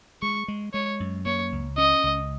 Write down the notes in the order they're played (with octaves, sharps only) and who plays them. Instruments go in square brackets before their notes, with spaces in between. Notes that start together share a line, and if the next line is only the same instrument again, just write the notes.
[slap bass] G#3 [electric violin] C#6
[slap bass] G#3
[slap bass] G#3 [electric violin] C#5
[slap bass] F#2
[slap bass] A#3 [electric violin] C#5
[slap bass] C#2
[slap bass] C#4 [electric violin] D#5
[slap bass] C#2